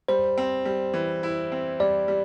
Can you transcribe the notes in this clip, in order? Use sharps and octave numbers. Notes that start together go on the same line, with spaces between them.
G3 C5
C4
G3
E3
E4
C4
G3 D5
G3